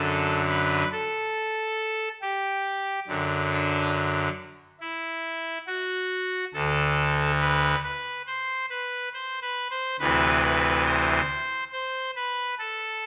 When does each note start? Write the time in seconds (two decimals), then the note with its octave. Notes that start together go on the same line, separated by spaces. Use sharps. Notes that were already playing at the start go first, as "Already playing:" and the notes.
Already playing: F#2 D3 A4
0.49 B4
0.92 A4
2.22 G4
3.07 F#2 D3
3.51 D4
4.81 E4
5.67 F#4
6.54 D2 D3 A4
7.40 B4
7.83 B4
8.27 C5
8.70 B4
9.13 C5
9.42 B4
9.70 C5
9.99 D2 C3 E3 B4
10.43 B4
10.86 C5
11.72 C5
12.16 B4
12.59 A4